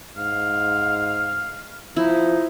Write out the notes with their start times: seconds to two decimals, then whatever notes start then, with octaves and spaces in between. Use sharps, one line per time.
0.17 G#2 F5
1.96 F3 D#4 E4